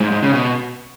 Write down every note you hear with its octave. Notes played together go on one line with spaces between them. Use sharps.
G#2
G#2
C#3
B2